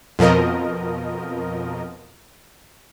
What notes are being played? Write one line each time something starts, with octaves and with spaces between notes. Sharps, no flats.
F2 B2 F3 A#4 D#5